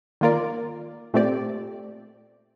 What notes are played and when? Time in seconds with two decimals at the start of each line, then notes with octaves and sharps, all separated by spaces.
0.21 D#3 A#3 F4 A#4 D5
1.14 A#2 A3 C4 G4 D5